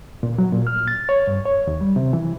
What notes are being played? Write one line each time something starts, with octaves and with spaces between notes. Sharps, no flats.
A#2
F#3
A#2
F6
A6
C#5
G2
C#5
D#2
G3
C3
E3